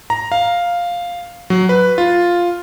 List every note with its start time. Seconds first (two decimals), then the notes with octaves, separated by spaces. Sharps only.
0.10 A#5
0.32 F5
1.50 F#3
1.69 B4
1.98 F4